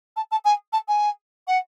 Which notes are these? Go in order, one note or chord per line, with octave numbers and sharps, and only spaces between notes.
A5
A5
G#5
A5
G#5
F#5